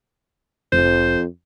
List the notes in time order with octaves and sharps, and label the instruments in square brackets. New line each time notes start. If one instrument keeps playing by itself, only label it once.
[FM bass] F1 [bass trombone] F2 [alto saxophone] C5